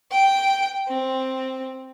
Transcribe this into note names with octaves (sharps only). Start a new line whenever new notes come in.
G5
C4